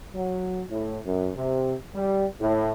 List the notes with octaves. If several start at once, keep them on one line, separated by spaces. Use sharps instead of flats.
F#3
A2
F#2
C3
G3
A2